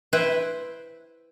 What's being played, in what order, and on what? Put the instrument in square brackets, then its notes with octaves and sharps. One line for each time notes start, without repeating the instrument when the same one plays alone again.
[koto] E4 B4 C5 G5